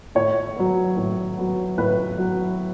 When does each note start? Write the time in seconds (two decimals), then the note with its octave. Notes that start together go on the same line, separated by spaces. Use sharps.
0.15 A2 C#5
0.56 F#3 B3
0.97 A2
1.37 F#3 B3
1.78 A2 B4
2.18 F#3 B3